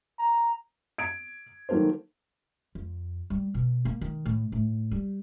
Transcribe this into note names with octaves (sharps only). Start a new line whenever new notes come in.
A#5
G#6 D7
D#3 F#3 A#3 A4 C5
F2
G3
B2
A#3
D#3
A2
A2
G3